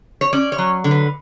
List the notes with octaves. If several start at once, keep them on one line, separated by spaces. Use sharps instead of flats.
C#5
C#4 D5
C#5
F#3
D3
B4